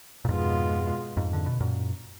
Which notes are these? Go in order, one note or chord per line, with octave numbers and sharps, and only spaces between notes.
A#2
F2 G#2 B2 G#3 B3 F4
F2 G#2
D3
B2
F#2 A#2